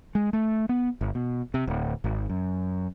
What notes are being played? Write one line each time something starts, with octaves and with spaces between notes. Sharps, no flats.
G#3
A3
B3
G1
B2
C3
D1
G#1
F#2